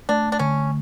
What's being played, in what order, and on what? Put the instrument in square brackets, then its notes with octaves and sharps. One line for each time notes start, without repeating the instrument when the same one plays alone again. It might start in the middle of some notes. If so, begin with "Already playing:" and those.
[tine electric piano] A3 [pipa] D4
[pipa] D4
[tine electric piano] D3 [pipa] C#4